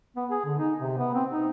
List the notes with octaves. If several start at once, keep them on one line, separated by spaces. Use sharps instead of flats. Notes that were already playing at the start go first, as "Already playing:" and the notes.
B3
G#4
D3
D#4
C3
B3
C4
D#4